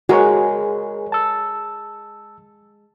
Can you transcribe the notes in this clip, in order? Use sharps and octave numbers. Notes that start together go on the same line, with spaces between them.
G#3 F#4 G#4 A#4 C#5
A5 E6